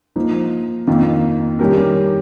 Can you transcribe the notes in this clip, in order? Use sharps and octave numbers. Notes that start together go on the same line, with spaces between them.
F3 A#3 D#4
F2 D#3 A#3 F4
D#3 G3 C#4 G4 A#4